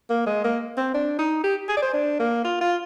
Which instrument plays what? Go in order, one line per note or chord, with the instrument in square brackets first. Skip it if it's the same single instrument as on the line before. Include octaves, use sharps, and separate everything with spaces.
[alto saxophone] A#3
G#3
A#3
C4
D4
D#4
G4
G#4
D5
C5
D4
A#3
F4
F4